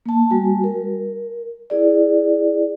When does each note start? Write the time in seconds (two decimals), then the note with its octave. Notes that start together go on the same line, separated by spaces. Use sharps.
0.06 A#3 A5
0.30 G3 F#4 G#5
0.64 A#4
1.70 E4 G#4 D5